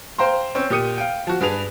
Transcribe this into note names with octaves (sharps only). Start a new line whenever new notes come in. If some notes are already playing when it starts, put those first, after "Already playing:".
C5 F5 G5 A#5 C6
C4 C#4
A#2 G4 D#6 C#7 D#7
F5 G5
F3 F#4
G2 G#4 B4 F7